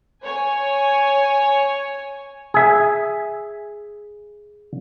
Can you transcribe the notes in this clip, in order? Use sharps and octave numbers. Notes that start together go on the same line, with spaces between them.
C#5 G#5
G#4 E5